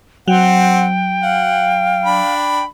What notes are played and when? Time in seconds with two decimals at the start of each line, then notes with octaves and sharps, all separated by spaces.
0.28 F#3 C4 F#5 G5
1.22 F5 F#5
2.05 D4 B5